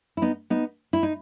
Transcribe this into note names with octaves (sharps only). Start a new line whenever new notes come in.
E4
B3 D#4
B3 D#4
E4
D#4